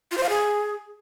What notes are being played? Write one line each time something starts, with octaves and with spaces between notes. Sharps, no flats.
F4
C5
F5
G#4